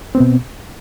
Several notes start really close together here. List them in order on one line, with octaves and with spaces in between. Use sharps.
C4 B3 B2